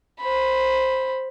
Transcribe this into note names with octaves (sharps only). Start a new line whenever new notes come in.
C5 B5